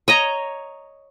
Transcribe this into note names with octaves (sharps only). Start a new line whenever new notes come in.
C#5 D#5 A#5